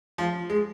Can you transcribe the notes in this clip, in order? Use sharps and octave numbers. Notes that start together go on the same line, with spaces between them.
F3
G#3